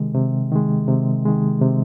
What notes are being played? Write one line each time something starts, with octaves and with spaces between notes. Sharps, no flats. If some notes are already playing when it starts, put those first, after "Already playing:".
Already playing: C3 D#3 G#3
C3
D#3 G#3
C3
D#3 G#3
C3